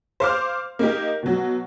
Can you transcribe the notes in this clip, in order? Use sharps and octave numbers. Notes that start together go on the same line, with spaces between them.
C5 F5 D6 F6
A#3 D#4 G4
B2 F#3